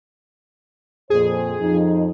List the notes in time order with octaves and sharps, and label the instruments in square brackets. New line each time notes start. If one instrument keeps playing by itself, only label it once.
[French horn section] F2 A#2 C5 [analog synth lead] G#4
[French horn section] F2 F3 D#4